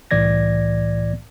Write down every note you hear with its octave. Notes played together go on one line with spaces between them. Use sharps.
C2 A2 E3 D5 G#6 A#6